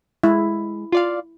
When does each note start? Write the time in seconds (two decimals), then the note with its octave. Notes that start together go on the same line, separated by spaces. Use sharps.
0.23 G#3 E4
0.92 F4 D5 F5